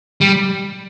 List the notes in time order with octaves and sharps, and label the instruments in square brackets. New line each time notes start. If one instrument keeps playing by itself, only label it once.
[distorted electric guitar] G3